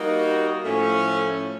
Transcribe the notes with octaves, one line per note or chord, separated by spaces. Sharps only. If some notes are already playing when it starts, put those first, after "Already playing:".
Already playing: G3 A#3 D#4 F#4
A2 F3 A3 C#4